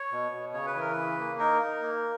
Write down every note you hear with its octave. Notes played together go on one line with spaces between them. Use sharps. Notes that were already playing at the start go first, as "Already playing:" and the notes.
Already playing: C#5
B2
B2
C#3 C#5
B4
E3 A#4
C#3 B4
A#3
D#4 A#4
D#4
A#3